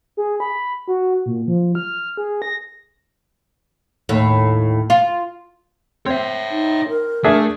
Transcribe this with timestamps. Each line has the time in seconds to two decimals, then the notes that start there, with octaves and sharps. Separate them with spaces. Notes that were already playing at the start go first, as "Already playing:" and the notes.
0.17 G#4
0.40 B5
0.88 F#4
1.26 A#2
1.48 F3
1.75 F6
2.17 G#4
2.42 A#6
4.09 D#2 A2
4.90 F4
6.06 C4 C#5 E5
6.51 D#4
6.89 A#4
7.24 A3 D4 G#4 E5